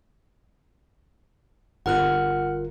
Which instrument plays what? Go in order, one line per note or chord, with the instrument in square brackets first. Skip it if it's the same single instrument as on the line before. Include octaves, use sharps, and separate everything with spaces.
[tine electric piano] G1 F4 A#4 [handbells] F#5 F6 F#6